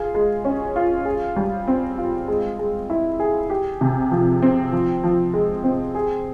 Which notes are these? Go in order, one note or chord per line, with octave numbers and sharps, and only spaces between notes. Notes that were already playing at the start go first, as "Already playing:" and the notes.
Already playing: F4 G#4
G#3
C#4
F4
G#4
G3
C4
F4
G#3
G#3
E4
G#4
G4
C3
F3
C4
F3
F3
G#3
C4
G#4